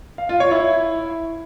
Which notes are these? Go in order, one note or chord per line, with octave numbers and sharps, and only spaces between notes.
F5
F4
C#5
E4